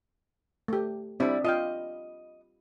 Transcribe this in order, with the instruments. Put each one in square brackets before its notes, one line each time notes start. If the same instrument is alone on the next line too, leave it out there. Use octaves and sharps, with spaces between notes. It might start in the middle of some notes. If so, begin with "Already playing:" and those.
[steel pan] A3 G4
[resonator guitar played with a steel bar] G3 E4 [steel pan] C4 D4 D5
[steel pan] F4 F5 G5 [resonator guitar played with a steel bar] D#5